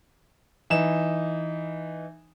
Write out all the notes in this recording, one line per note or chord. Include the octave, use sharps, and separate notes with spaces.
E3 D#4 E7